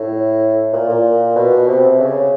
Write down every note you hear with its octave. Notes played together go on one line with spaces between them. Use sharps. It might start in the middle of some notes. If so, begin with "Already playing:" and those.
Already playing: A2
A#2
A#2
B2
C3
C#3